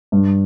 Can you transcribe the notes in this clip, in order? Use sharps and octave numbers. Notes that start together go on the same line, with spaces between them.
G2